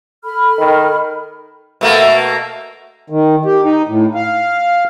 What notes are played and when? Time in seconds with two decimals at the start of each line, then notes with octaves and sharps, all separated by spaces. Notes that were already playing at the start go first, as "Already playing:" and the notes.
0.24 A4 B5 F6
0.58 D#3
1.81 B2 A3 A#3
3.10 D#3
3.45 G4
3.64 D#4
3.88 A2
4.15 F5